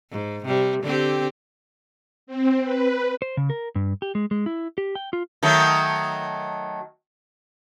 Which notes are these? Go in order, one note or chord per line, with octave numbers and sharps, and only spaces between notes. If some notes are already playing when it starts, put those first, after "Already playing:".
G#2
C3 G3
D3 C4 G4
C4
B4
C5
C#3
A#4
G2
G4
G#3
G#3
E4
G4
G5
F4
D#3 F#3 A3